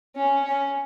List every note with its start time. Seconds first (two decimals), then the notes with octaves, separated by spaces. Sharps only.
0.16 C#4
0.45 C#4